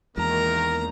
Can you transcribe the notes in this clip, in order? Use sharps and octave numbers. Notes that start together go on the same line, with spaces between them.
E2 D#3 E3 G#3 A#3 A#4 A#5